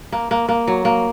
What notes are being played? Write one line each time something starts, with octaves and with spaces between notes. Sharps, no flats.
A#3
A#3
A#3
F#3
A#3